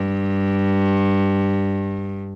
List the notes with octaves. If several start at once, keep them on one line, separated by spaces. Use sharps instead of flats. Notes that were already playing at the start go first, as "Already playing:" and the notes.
Already playing: G2